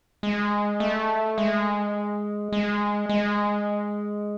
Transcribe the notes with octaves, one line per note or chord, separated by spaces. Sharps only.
G#3
A3
G#3
G#3
G#3